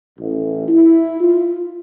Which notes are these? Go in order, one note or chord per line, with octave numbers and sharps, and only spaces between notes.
A1
E4
F4